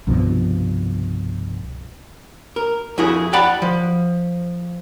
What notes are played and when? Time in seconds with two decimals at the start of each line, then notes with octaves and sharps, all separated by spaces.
0.07 C2 G2 B2 F3
2.56 A#4
2.98 F2 E4 F#4 G#4
3.33 D5 F#5 G5 A5 B5
3.62 F3